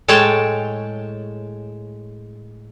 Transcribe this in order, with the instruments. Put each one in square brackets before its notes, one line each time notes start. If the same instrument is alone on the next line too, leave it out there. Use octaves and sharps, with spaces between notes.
[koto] A2 G#3 C#5 G5 A5